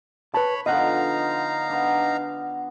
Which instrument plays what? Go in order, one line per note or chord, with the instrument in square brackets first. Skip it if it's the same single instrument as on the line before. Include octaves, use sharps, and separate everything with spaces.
[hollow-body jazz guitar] B4 A5 [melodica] C#5 B5
[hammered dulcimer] D3 F3 B3 [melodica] D#4 F5 A#5 [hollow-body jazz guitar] D#5 F#5
[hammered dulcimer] B3 D4